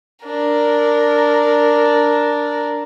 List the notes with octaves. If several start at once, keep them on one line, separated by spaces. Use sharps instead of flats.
D4 A#4